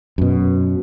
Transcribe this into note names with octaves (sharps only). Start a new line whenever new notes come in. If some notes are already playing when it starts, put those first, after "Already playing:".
F#2 B2